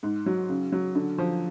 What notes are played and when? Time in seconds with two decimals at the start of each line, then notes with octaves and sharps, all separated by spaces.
0.03 G#2
0.26 F#3
0.49 C#3
0.72 F#3
0.95 D3
1.18 F3